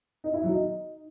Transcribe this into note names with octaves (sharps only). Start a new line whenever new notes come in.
D#4
E4
F#3
D#4